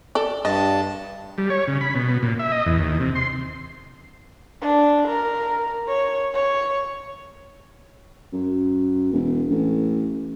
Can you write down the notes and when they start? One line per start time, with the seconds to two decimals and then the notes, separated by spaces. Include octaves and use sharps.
0.15 A4 D5
0.45 G2 D#5 A5
1.38 G3
1.50 C#5
1.68 C#3
1.81 B5
1.95 B2
2.23 A#2
2.39 E5
2.52 D#5
2.66 E2
2.79 D#2
3.00 C3
3.15 C6
4.62 D4
5.08 A#4
5.88 C#5
6.34 C#5
8.33 F#2
9.12 E1
9.50 A1